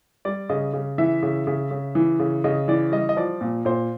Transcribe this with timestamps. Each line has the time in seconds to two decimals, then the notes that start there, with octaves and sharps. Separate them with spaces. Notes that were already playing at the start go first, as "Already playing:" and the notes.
0.25 G3 D5
0.49 C#3 D#5
0.73 C#3
0.98 E3 E5
1.23 C#3
1.47 C#3
1.71 C#3
1.95 E3
2.19 C#3
2.44 C#3 D#5
2.68 E3 D5
2.92 G3 D#5
3.09 D#5
3.17 F3 D5
3.41 A#2
3.65 A#2 C5